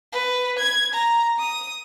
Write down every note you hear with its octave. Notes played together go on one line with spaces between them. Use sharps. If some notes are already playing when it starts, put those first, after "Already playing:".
B4
G#6
A#5
D#6